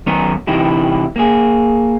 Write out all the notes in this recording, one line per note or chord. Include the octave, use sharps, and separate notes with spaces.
F#2 D#3 B3 C#4 D#4 A#4
C3 E3 D#4 E4 G4
A#3 G#4